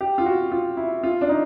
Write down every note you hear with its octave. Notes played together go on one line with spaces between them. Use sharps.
G4
F4
F#4
F4
E4
F4
D4
D#4